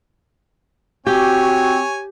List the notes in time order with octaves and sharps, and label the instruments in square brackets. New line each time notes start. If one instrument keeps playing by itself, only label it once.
[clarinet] C4 [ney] F#4 [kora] G4 [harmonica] C#5 G#5